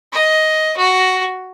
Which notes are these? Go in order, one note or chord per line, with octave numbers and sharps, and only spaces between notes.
D#5
F#4